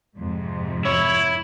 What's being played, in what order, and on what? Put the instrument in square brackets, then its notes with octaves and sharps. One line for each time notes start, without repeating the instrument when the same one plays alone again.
[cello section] F2 G#2 C3
[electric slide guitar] E4 [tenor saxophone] C#5